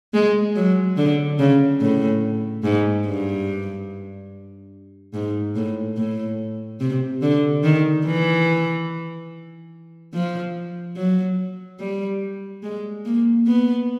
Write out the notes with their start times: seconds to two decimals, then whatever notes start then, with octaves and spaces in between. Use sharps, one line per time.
0.14 G#3
0.55 F#3
0.97 D3
1.39 C#3
1.81 A2
2.63 G#2
3.05 G2
5.14 G#2
5.56 A2
5.97 A2
6.80 C3
7.22 D3
7.63 D#3
8.05 E3
10.14 F3
10.97 F#3
11.79 G3
12.63 G#3
13.05 A#3
13.47 B3